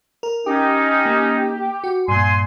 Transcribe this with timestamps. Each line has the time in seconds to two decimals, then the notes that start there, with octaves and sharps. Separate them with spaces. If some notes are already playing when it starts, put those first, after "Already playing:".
0.23 A#4
0.46 C#4 D#4 G4
1.06 A#3
1.84 F#4
2.08 G2 A#2 G#5 C6